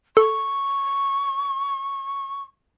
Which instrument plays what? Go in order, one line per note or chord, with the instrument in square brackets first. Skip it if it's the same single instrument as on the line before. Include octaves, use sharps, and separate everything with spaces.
[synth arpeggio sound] A4 [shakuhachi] C#6